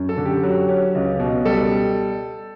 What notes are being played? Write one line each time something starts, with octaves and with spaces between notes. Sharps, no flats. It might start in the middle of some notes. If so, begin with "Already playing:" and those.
Already playing: F#2
A4
D3
G4
F#3
C#4
C#2
B2
G3 A4